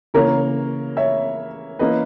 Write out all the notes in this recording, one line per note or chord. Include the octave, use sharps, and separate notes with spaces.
C#3 E3 A#3 A#4 C#5
C#5 E5
E3 A#3 C#4 B4 D#5